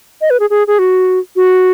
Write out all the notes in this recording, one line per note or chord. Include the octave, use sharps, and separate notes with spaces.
D#5
B4
G#4
G#4
G#4
F#4
F#4